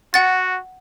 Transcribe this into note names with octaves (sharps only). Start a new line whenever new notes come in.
F#4 F#5 A6